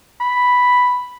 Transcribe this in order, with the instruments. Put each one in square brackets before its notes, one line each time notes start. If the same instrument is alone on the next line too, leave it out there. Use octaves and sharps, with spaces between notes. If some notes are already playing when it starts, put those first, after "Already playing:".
[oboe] B5